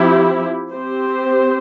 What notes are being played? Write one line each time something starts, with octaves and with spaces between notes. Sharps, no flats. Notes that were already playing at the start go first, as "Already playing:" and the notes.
Already playing: F3 C4 E4 G4
C4 G4 C5